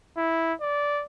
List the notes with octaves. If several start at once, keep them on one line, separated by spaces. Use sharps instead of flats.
E4
D5